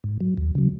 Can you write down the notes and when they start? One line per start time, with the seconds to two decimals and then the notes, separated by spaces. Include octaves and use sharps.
0.04 G#2
0.21 F#3
0.38 D#2
0.55 C#3 F#3